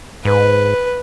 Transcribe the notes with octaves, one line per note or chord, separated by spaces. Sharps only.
G#2 B4